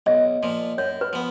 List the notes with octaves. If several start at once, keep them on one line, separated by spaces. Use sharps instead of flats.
B1 D#5
A#2 F3
F#2 C#5
B4
F3 B3